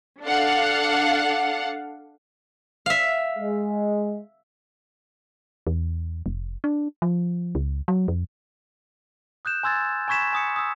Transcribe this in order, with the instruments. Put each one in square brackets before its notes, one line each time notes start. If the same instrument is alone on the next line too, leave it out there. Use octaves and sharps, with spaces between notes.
[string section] D4 A4 F5 F#5
[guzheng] E5 F5
[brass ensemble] G#3
[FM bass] E2
F1
D4
F3
C#2
F#3
F2
[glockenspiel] D#6 F#6 G6 E7
G#5 C6 E6 G#6 A6
G#5 B5 C#6 G#6 B6 E7
G#5 D#6 C#7
D#6 E6